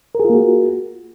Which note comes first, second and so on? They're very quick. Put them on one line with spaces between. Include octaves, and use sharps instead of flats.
A#4 G#4 F4 A#3 F#4